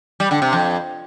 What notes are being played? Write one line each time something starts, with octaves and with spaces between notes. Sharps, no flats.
G3
D3
C3
F2